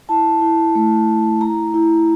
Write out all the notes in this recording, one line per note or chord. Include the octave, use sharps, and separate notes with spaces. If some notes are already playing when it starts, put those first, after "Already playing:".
E4 A5
E4
A3
A3
E4 A#5
E4